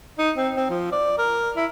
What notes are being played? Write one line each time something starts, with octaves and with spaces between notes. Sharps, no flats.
D#4
C4
C4
F3
D5
A#4
E4